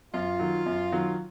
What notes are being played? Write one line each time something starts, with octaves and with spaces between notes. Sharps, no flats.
F#2 F4
D#3 F#3
F#2
D#3 F#3